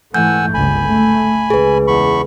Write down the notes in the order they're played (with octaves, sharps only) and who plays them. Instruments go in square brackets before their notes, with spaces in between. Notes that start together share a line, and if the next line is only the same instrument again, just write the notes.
[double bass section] G#2 E3 A3 [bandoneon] F#5 G#5 E6 [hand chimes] G6
[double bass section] G1 C#2 [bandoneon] G#5 B5
[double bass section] A3
[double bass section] C#2 [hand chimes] G#4 B4
[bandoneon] E2 B5 C#6